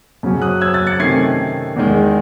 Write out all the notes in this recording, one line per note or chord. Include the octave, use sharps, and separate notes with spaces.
F#2 C#3 F#3 C#4
D#6 F#6
E6 G#6
F#6 A6
A6 C#7
C3 D#3 A3 C#4 G#6 C7
E2 D#3 G#3